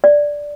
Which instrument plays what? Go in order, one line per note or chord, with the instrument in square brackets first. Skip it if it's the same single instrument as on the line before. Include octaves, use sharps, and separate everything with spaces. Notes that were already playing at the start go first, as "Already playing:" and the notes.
[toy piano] D5